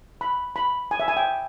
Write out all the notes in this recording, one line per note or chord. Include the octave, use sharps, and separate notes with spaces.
B5
B5
G#5
E5
G#5
G5